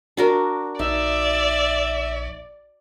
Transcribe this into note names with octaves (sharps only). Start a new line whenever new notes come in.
D4 F#4 A#4
A#1 D#4 D5 E5